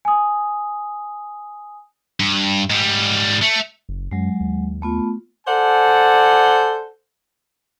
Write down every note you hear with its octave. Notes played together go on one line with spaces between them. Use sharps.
G#5 D#6
G2
G#2 G3
A3
F#1
F#2 F#3 G#3
D#2
A3 B3 F4
A4 C5 D5 F#5 G#5